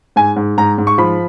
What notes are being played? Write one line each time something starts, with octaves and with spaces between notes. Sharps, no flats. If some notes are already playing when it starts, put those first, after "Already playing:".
G#2 G#5
G#2
G#2 A#5
G#2
C#6
F3 B5